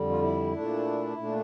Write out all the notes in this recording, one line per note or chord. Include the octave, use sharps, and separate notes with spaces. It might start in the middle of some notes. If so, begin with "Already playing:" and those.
Already playing: F2 D3 G3
F4
E4
A#2 A3 D4
A#2 A3 D4